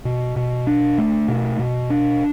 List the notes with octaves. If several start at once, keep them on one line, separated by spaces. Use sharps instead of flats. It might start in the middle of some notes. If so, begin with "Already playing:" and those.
B2
B2
D4
A3
B2
B2
D4